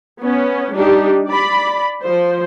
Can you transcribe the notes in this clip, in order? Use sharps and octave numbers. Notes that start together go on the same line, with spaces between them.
B3 C#4
G3 D4 D#4 G4
D5 B5
F3 C5